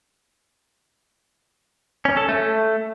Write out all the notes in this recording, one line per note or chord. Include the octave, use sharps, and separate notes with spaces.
C#4
A4
A3